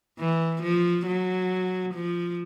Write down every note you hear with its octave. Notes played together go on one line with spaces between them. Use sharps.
E3
F3
F#3
F3